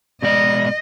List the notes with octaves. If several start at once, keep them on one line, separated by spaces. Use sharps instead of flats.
B2 G#3 D5 D#5